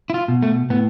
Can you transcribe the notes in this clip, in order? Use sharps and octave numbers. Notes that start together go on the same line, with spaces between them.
E4
F4
B2
A3
A2 B3